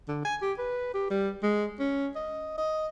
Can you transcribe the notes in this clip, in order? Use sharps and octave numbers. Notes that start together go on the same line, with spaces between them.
D3
G#5
G4
B4
G4
G3
G#3
C#4
D#5
D#5